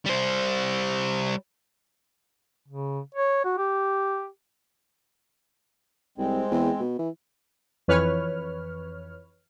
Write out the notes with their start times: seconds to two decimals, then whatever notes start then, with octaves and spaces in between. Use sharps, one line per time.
0.06 G3 C5
2.68 C#3
3.15 C#5
3.45 F#4
3.58 G4
6.18 C2 G#3 C4
6.51 E2
6.80 B2
6.99 E3
7.88 F2 E3 B4 C#5 F6